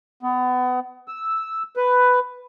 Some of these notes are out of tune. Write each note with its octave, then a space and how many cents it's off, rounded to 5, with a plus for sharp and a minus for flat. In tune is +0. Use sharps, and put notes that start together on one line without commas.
B3 +30
E6 -5
B4 +10